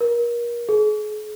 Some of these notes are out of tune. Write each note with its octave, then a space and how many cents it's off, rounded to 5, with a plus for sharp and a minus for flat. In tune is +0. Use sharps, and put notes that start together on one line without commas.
A#4 +30
G#4 +35